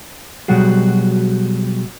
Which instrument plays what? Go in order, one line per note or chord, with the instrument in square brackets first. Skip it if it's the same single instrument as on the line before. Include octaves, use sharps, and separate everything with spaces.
[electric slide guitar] B2 F#3 G3 F#4 G#4